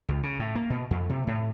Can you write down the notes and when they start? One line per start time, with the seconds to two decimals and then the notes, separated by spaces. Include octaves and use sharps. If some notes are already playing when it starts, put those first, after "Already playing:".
0.08 C#2
0.23 C#3
0.39 A2
0.55 A#3
0.70 B2
0.91 F2
1.09 C3
1.27 A2